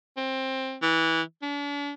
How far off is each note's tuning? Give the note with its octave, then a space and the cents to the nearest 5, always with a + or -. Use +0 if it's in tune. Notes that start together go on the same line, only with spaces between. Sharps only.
C4 +15
E3 -15
D4 -40